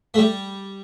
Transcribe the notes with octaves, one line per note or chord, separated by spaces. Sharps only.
A3
G3